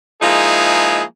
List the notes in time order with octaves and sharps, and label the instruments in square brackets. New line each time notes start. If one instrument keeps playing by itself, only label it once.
[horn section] F3 G#3 A#3 D#4 E4 G#4